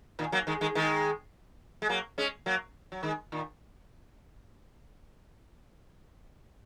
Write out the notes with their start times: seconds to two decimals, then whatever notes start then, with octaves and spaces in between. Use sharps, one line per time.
0.19 A#2 D#3
0.32 F#3 A#3
0.47 D#3 G#3
0.61 D#3 G#3
0.75 D#3 G#3
1.82 G#3
1.89 F#3 A#3
2.18 G#3 C#4
2.46 F#3 A#3
2.92 F#3
3.03 D#3 G#3
3.32 A#2 D#3